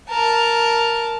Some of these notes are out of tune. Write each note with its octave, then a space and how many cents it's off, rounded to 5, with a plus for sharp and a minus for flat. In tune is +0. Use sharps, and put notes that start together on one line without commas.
A#4 +0 A5 +0